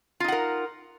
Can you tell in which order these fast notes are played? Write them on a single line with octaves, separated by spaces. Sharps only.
F4 D#4 F#5 A#4